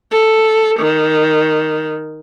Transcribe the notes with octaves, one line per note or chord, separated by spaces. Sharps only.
A4
D#3